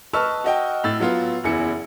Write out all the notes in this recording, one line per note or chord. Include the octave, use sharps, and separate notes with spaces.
B4 D#5 A5 C#6 E6 F6
F#4 D#5 G5
A2 E6 A6
F#3 B3 F4
F#1 E2 E4 C#7